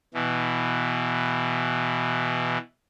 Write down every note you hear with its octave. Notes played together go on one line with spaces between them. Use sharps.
B2 E3